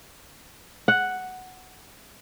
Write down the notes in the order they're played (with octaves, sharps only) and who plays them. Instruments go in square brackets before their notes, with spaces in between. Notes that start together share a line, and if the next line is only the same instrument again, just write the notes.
[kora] F#5